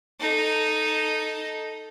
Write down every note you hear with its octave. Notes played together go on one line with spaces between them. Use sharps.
D#4 A4